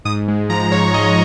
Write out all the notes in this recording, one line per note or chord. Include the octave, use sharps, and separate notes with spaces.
G#2 D#6
G#3
F3 A#5
G#2 C#5
G#2 D#5